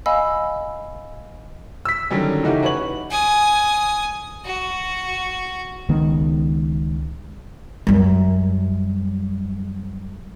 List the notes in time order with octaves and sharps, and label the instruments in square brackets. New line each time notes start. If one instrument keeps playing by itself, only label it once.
[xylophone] D#5 F5 G#5 B5 E6
[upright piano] E6 B6
D3 D#3 F#3 G3 C#4
C#3 E3 A3 D#4 F#4 G4
F#4 B4 C#5 F#7
[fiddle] G#5 D#6
F#4
[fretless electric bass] C#2 D#3 B3
[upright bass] F#2 G3